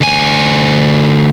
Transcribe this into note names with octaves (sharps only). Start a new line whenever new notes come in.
D2 G#5